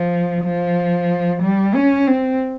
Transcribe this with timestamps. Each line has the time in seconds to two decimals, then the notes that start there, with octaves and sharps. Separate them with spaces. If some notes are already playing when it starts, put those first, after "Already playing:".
Already playing: F3
0.44 F3
1.42 G3
1.74 C#4
2.07 C4